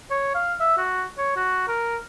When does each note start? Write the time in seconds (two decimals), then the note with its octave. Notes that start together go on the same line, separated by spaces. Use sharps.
0.11 C#5
0.35 F5
0.61 E5
0.78 F#4
1.18 C#5
1.37 F#4
1.68 A#4